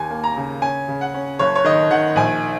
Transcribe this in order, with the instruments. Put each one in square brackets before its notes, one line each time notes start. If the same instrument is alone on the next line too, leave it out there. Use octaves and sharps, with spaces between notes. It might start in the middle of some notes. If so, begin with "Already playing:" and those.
Already playing: [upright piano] D#2 G#5
A#3
A#5
C#3
C#4 G#5
C#3
F#5
C#4
F#1 C#5
C#5
D#3 D#5
D#3 F#5
A#1 G#5